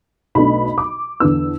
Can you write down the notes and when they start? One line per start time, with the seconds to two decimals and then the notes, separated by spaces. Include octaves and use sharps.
0.35 B1 B2 A3 D4 B5
0.78 D6
1.20 E2 D3 B3 D4 E6